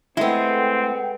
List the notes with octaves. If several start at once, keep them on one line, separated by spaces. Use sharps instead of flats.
G#3 A3 B3 C4 E4 A4 F#5 G5